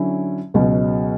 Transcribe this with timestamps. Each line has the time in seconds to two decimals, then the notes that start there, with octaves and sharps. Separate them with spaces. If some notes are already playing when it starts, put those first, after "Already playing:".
Already playing: D3 F#3 C#4 E4
0.54 C#2 B2 F#3